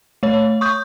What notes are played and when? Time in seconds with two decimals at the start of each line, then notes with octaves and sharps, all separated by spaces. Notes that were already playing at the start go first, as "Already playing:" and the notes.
0.23 A3 C#5
0.61 C#6 D#6 G6